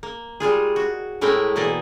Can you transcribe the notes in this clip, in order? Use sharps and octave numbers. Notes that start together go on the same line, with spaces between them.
A#3
G3 G#3 F4 G#4
F#4
A2 G#3 A3 E4 A#4 G5
B2 E3 A#3 D5 D#5